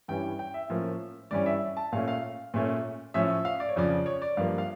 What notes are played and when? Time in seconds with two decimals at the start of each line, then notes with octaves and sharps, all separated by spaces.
0.08 G2 E3 G3 C#4 G5
0.39 G5
0.54 E5
0.69 A2 F3 A#3 C#4
1.31 G2 E3 G3 C#4 D5
1.46 E5
1.77 A5
1.92 A#2 A3 C#4 F5
2.08 F5
2.54 A#2 A3 C#4
3.14 A2 F3 C#4 E5
3.45 F5
3.60 D5
3.69 C#5
3.76 F2 C#3 F3 D5
4.06 C#5
4.22 D5
4.37 G2 F3 A#3 F5
4.58 F5